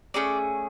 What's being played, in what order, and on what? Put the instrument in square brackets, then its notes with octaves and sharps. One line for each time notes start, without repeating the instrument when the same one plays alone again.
[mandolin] A3 C#4 G#4 D5